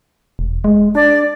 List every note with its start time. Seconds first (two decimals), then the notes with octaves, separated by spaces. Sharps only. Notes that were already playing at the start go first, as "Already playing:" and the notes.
0.39 E1
0.64 G#3
0.95 D4 D5